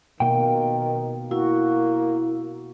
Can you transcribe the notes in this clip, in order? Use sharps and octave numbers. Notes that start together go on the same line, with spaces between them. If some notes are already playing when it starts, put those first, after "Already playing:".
B2 D#3 A#3 G5
A#3 E4 F#4